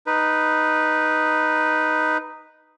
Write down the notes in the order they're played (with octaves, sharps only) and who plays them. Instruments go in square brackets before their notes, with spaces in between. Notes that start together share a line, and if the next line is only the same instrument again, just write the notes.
[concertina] D#4 B4